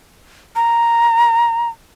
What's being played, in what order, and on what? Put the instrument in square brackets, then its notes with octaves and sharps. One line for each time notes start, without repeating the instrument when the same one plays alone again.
[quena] A#5